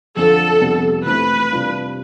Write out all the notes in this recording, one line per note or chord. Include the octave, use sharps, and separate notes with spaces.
F2 D3 F3 A4
F2 C3 G3 B3
E3 A3 C4 E4 B4
C3 G3 D4 F4